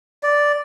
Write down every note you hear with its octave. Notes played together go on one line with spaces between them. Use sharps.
D5